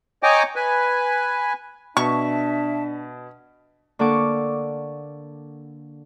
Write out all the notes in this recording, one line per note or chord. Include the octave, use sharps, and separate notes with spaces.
C#5 D#5 G5 G#5 A#5 D6
B4 G#5
B2 D4 E5 A5 C#6
D3 A#3 A4 F#5 C#6 D6